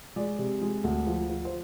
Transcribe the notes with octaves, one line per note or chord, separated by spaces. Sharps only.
G#3 D5
C3
G#3
D2
F3
F3
C5